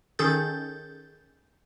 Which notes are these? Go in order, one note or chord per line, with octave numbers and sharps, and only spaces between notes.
D#3 C#4 G#4 A4 G6 A6